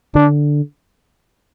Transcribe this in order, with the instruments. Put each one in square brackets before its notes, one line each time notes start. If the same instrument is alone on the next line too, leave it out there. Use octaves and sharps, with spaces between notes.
[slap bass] D3 [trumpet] D4